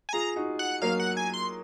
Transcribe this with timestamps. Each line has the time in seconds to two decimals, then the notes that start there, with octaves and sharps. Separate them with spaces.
0.09 G#5
0.13 F4 G#4 A#5
0.36 D#4 F#4
0.59 F#5
0.82 F#3 A#3 F5
1.00 F#5
1.17 G#5
1.34 C6